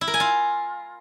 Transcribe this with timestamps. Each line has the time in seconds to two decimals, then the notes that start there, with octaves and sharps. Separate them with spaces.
0.01 E4
0.08 A#4
0.14 G#5
0.20 F4